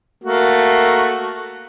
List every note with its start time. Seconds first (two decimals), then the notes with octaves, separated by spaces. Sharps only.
0.24 A3 A#3 F#4